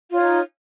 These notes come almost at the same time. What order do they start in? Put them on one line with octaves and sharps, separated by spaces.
F4 C#5 D#4